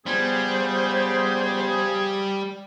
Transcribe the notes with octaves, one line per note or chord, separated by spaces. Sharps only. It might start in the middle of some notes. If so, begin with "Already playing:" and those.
C#3 F3 G3 B3 G#4 C5